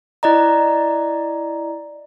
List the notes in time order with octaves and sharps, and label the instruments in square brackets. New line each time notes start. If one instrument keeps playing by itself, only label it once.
[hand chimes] E4 D5 D#5 A#5